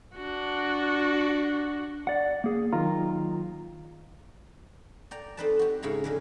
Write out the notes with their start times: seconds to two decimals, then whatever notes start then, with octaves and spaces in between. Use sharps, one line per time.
0.18 D4 F#4
2.07 D5 F#5
2.44 A#3 G#4
2.73 D#3 F#3 F4 A#5
5.11 D5 G5 A#5
5.37 C4 D#4 A4 B4 D5 A5
5.59 F#4 G4
5.82 G#2 C#3 E4 A#5
6.04 F2 D3 G#3